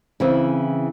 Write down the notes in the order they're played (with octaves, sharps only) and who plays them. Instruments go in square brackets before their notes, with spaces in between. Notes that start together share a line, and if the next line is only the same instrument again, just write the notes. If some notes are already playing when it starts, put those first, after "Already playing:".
[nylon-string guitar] C#3 E3 C4 E4